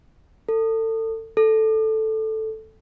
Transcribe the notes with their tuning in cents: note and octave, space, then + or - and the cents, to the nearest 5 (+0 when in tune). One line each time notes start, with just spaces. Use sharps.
A4 +30
A4 -5